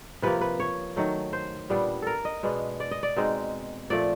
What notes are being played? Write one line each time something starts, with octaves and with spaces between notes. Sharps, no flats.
C3 F3 A#3 B4
B4
C#5
D#3 F#3 A3
C5
A#2 G3 B3 D4
A4 A#4
D#5
B2 G#3 B3 D4
D5
D#5
D5
B2 G#3 C4 D#4
A#2 F3 A3 D5